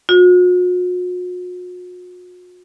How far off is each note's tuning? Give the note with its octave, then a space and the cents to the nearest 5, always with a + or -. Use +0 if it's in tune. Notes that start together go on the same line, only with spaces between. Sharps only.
F#4 -45